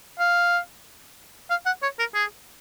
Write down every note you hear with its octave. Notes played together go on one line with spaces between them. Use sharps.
F5
F5
F#5
C#5
A#4
G#4